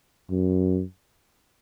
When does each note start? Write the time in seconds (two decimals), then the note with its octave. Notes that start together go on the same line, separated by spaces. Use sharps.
0.30 F#2